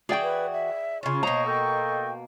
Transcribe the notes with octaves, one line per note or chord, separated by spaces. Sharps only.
E3 F#4 G#4 D5 G5
B4
E5
C#3 C#4 F4 C#6
B2 A#3 C5 C#5 D#5 A#5
A4 D#5 G5